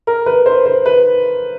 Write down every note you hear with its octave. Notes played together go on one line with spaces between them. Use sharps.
A#4
B4
C5
C5
B4